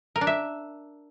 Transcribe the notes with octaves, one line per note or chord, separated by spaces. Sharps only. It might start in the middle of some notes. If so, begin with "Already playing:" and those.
A#4
D4
E5